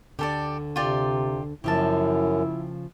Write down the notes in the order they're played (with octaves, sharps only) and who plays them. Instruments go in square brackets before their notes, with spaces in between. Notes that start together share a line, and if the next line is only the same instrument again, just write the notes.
[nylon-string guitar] D2 D3 [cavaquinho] G4 A4 D5
[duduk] C3 [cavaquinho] F4 G4 D5
[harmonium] F#2 [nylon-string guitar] C#3 F3 A#3 [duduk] E4 [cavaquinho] G4 A5